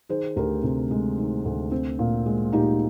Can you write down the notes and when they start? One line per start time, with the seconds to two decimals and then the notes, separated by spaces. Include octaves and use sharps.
0.09 D#3 G#4 C5
0.36 D2 G4 A#4
0.63 C3
0.91 G#3
1.18 D#3
1.45 D2
1.72 C4
1.99 A#2
2.26 G#3
2.53 A#2 D#4 G4